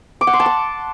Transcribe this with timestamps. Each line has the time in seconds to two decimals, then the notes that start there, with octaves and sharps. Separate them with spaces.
0.21 D6
0.27 F#5
0.33 C6
0.40 A5
0.46 D6